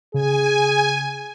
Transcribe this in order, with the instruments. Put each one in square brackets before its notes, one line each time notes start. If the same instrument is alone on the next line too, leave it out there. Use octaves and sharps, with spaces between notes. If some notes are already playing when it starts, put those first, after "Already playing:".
[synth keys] C#3 [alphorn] G#4 [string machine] G#5